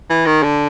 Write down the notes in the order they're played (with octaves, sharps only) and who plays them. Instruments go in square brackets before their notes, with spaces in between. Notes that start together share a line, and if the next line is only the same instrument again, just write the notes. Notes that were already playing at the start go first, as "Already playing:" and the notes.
[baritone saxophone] E3
D#3
D3